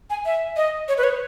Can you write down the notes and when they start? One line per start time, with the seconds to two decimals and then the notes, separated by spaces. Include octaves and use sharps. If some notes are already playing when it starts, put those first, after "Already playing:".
0.10 G#5
0.26 E5
0.57 D#5
0.88 C#5
0.98 B4
1.04 C#5